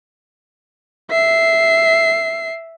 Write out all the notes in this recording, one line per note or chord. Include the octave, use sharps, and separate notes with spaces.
E5 C7